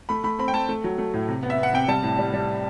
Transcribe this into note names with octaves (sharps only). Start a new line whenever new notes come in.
A3 B5
A3 B5
C4 B5
G5
A3 A5
A3
F#3
A3
A2
C3
B3
E5
B3
F#5
C3 G5
G3 A5
A2
G3
G3